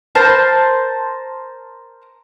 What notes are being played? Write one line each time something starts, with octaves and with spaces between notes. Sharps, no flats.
A#4 C5 A5